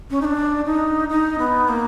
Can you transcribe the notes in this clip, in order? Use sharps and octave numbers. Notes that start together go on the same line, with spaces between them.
C#4
D#4
D4
D#4
D#4
B3
A#3